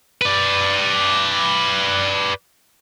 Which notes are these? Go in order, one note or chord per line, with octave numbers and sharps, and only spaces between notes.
B4 D5